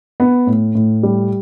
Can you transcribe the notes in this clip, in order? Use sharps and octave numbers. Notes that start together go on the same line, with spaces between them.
B3
A2
A2
G3